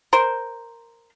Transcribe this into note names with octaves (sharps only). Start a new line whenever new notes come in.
A#4 C5